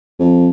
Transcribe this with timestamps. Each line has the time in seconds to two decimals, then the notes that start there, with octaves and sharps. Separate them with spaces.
0.19 F2